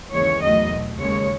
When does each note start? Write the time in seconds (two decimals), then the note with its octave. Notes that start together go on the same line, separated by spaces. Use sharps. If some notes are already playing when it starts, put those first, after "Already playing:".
0.12 D#2 C#3 E3 G#3 C#5
0.41 E2 D#3 F#3 A3 D#5
0.70 B2 A3
0.99 D#2 C#3 G#3 C#5